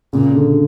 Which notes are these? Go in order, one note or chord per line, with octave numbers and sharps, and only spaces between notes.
A#2 C#3
D3